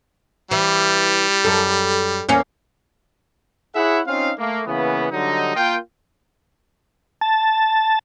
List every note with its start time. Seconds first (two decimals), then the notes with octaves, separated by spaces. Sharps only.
0.51 E3 G3
1.44 F#2 A4
2.28 E2 A#3 C#4
3.76 E4 G#4 C#5 E5 F#5
4.07 C4 C#4 D#4 F4 F5
4.38 A3 A#3
4.67 C#3 E3 A#3 B3
5.11 D3 F#3 G3 D#4
5.56 A#3 F4 G5
7.21 A5